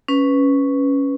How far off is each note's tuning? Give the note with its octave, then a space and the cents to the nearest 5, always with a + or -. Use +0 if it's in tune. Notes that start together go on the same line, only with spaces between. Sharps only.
C#4 +0 B4 +0